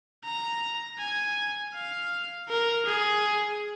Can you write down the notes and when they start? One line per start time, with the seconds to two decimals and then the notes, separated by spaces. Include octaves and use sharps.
0.25 A#5
0.99 G#5
1.74 F5
2.49 A#4
2.86 G#4